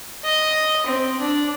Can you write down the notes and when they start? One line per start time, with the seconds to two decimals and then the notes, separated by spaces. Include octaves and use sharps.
0.25 D#5
0.86 C4
1.20 D4